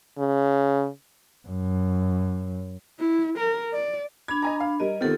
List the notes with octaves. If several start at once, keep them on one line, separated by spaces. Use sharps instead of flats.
C#3
F#2
E4
A#4
D5
D4 B5 G#6
D#5 G#5 A#5
F5
G3 A#4 D#5
D#3 B3 C4 F4 G4 A4